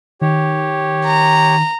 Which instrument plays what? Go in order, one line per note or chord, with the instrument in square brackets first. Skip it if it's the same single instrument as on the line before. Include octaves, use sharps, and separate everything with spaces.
[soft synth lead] D#3 [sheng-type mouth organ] G4 C#5
[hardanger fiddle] A#5